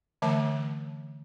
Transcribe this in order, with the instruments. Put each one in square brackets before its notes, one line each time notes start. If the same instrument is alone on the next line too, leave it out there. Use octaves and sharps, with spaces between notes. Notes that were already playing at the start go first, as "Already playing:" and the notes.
[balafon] D3 E3 A3 E5 A5